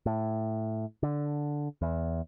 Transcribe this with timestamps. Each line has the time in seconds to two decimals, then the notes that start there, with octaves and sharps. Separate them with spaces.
0.06 A2
1.03 D3
1.82 E2